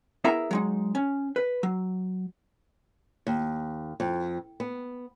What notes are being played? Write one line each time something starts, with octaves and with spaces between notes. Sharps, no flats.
B3 E4 G#4 A#4 E5 A#5
F#3 G#3 D#4
C#4
B4
F#3
D#2
F2
B3